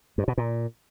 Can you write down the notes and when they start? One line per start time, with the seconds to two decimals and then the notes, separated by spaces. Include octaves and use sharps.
0.18 G2
0.28 B2
0.38 A#2